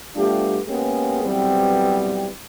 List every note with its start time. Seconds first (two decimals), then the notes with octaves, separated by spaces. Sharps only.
0.16 G3 A3 B3 D4 F4 G4
0.68 G#3 A#3 B3 C#4 G4 G#4
1.23 B1 E3 G3 B3 C4